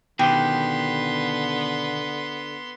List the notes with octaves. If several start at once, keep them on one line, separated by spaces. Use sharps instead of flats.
B2 D3 D#3 B3 G4 C6